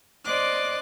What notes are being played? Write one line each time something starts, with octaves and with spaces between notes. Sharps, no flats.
C5 D5 D#5 C6 D6 F#6